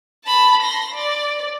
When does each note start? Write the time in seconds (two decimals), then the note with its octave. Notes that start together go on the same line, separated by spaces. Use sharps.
0.25 A5 B5
0.63 C6 A#6
0.94 D5